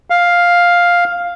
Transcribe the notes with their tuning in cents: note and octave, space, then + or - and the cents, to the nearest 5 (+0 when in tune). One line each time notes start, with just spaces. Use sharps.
F5 +5